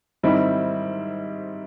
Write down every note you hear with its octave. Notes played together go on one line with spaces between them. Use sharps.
G#2 D#3 G3 C4 E4